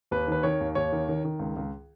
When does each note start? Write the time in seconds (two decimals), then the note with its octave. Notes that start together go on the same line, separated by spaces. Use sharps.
0.11 D#2 B4
0.27 D#3 B4
0.43 D#3 C#5
0.60 D#2
0.75 D#2 C#5
0.92 D#3
1.08 D#3
1.25 D#3
1.39 C#2
1.56 C#2